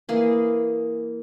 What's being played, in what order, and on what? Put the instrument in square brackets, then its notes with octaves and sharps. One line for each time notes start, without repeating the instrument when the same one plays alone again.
[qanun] E3 A#3 G#4